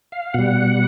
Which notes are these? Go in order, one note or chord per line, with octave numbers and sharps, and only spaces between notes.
F5
B2 G3 F#5